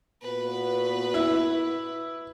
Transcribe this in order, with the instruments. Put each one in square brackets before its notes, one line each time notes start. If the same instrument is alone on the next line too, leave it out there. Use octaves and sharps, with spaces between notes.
[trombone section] A#2 B3 F#4 [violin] B4
[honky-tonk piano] E4